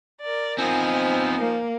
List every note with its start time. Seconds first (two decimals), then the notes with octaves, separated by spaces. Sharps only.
0.21 A#4 D5
0.59 F3 B3 C4 D#4 G#5
1.38 A#3